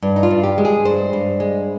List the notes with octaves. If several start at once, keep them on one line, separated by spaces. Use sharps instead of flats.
G2
D#4
F4
G2
G4
G#3
G#4
G2 C5
G2
G#3